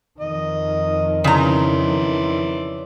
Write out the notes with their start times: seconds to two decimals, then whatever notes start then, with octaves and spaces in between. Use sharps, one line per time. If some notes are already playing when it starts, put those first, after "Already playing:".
0.20 F2 D#3 D#5
1.24 C#3 E3 D5 A#5 C6